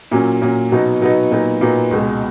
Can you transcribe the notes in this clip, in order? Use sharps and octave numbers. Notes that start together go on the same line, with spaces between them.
A#2 F#3 C#4
A#2 F#3 C#4
B2 F#3 B3 D#4
B2 F#3 B3 D#4
A#2 F#3 B3 D#4
A#2 F#3 B3 D#4
C#2 B2 G#3